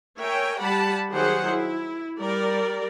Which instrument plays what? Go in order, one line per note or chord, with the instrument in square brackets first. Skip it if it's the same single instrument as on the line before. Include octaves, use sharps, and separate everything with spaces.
[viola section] A#4 C#5 E5 G5 G#5
G3 G4 F#5 A5 B5
D#3 F#3 G4 G#4 C5 F#5
E4
G3 A#4 D5